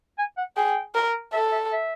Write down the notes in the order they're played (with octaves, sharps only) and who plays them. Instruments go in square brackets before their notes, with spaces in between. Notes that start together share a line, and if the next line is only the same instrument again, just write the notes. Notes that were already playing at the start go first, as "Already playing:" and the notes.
[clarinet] G#5
F#5
[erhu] G#4 [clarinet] G5
[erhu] A#4
[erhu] A4 [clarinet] E5
[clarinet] E5
E5